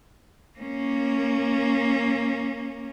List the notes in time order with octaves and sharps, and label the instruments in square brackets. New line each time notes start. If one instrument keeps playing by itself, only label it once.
[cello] A#3 C#4